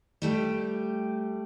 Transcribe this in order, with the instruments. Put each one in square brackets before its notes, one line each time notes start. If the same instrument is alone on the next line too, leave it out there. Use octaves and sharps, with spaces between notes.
[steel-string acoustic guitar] G3 A3 G4